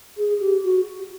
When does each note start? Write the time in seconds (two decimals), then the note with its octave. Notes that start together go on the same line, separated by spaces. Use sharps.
0.17 G#4
0.40 G4
0.64 F#4